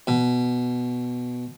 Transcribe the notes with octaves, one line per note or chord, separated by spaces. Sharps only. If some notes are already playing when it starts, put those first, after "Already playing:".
B2